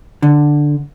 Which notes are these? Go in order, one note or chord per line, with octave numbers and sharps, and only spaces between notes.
D3